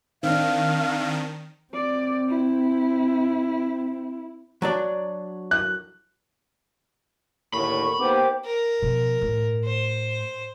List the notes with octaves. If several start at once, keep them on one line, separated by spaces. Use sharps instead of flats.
D#3 C4 D4 F5
C4 D5
E4
F#3 D4 D5
F#6
D#2 A2 D3 B5 C#6
A#3 B3 D#4 G4 C5 D6
A#4
B2 F3
A2
C5